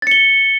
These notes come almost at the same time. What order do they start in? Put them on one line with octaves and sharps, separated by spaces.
A6 C#7 G7